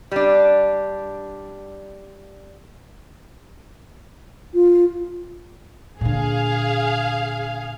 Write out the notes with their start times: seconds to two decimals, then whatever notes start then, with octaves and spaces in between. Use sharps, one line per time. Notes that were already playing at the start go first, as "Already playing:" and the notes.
0.12 G3 D4
4.54 F4
6.01 A#2 D3 G#4 F5